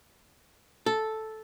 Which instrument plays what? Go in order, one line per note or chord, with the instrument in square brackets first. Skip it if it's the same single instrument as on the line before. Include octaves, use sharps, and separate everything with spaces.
[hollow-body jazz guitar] A4